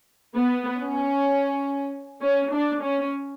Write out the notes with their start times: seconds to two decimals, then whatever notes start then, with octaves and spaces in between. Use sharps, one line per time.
0.36 B3
0.81 C#4
2.22 C#4
2.53 D4
2.84 C#4